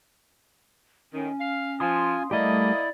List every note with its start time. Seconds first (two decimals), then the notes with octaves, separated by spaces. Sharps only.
1.13 A2 D#3 C#4
1.39 F5
1.80 F3 F4 F5 G#5 C6 D#6
2.31 G3 A3 A#3 E4 G4 D5 D#5